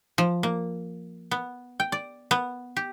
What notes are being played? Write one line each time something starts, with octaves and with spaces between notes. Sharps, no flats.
F3
A#3
B3
G5
D5
B3
G4